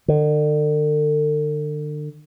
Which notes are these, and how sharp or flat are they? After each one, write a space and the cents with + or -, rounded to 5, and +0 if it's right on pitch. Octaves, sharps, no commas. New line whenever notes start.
D3 +40